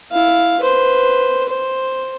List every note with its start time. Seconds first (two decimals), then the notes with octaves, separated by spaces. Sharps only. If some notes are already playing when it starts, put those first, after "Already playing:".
0.12 E4 F5
0.61 B4 C5
1.49 C5